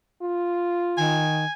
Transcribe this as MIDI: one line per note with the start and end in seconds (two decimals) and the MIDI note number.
0.22 1.24 65
0.98 1.45 51
0.98 1.53 80